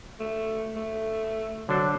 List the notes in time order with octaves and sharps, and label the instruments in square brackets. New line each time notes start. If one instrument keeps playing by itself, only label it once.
[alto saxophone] A3
A3
[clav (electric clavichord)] D3 D4 C5 [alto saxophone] F#3